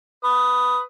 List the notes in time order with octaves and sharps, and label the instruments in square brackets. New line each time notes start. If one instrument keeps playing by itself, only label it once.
[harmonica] B4 D#6